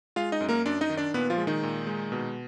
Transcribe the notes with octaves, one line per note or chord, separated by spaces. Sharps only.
G#3 F4 F5
D#4 D#5
F#2
A#3 A#4
F#2 D4 D5
D#4 D#5
D#3
D4 D5
A#2 B3 B4
F3 F4
G#3
D#3 D#4
A#2
G#3
B2